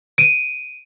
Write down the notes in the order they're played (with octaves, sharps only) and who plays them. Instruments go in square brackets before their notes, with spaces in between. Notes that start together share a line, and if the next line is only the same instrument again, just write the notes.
[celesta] D7 D#7